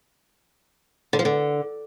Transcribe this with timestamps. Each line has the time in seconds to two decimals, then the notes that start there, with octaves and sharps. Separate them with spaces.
1.13 D3
1.19 F3
1.25 D3